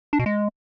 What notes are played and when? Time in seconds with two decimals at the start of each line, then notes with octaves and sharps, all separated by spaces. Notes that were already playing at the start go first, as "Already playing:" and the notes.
0.13 D4
0.19 B2
0.26 G#3